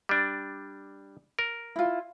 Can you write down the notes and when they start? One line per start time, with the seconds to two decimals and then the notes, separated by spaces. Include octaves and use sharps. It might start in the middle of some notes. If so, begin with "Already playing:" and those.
0.09 G3 D4
1.39 A#4
1.76 E4 F4